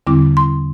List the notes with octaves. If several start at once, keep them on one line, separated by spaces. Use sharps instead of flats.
E2 D3 G3 C4 E4 D6
C6